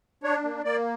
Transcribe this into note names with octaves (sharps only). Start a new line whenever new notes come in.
D4 C#5
A#3
A#3 D5